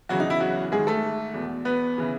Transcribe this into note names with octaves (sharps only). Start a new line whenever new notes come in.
E2 C#3 E3 F#3 F#4
D#4
E4
F#3 F#4
G#2 D#3 G#3 G#4
A3 A4
E2 B2
B3 B4
C#3 E3